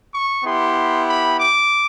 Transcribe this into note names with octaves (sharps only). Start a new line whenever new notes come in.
C#6
B3 E4 G4 C6
B5
D6